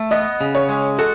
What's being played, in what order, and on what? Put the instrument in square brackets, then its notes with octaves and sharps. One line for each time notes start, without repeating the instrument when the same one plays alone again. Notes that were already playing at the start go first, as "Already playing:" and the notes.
Already playing: [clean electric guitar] A3
[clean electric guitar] B3 [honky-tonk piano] D#5
[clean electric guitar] C#3
[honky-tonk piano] C#5
[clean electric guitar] G#3
[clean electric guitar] F#4 [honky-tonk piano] A4